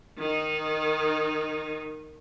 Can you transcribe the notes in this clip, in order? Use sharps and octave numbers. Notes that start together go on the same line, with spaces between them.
D#3 D#4